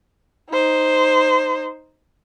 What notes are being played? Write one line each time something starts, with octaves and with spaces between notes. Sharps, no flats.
D#4 C5